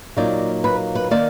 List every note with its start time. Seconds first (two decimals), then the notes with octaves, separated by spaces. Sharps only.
0.17 A#2 F#3 A#3 D#4 D5
0.64 B4
0.95 B4
1.11 D#3 A#3 D#4 D5